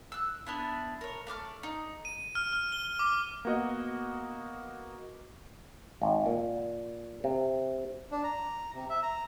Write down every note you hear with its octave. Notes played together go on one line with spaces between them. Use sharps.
E6 F#6
B3 D4 E4
A#4 C#5
A3 D5 D6 F6
D#4
D#7
F6
F6
G7
D6
A#3 B3 F#4 D#5
G#1
A#2
C3
D4
A#5
C3
E5
A#5